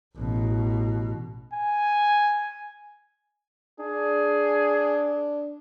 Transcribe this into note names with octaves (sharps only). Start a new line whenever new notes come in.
A1 B2
G#5
D4 G#4